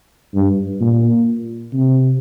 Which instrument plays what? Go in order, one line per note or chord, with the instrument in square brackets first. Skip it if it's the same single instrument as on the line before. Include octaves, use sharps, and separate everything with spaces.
[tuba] G2
A#2
C3